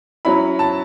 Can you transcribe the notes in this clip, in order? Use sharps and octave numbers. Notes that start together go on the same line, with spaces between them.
F#3 C#4 E4 B5
A5